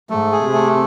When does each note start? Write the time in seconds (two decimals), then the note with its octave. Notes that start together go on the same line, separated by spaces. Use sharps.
0.10 G#2 A3
0.32 G#4
0.43 C3
0.53 A3